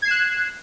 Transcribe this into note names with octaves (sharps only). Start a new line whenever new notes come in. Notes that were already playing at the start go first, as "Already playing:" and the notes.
F#6 G#6 C7 E7